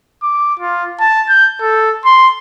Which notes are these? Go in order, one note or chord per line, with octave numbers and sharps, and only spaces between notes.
D6
F4
A5
G6
A4
C6